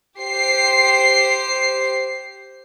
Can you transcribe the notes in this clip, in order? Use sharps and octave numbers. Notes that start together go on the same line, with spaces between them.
G4 C5 C7